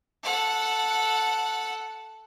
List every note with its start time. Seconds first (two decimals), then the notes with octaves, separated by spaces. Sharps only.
0.23 A4 F#5